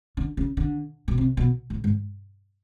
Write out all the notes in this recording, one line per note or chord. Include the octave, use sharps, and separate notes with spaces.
D3
C#3
D3
B2
C3
B2
A2
G#2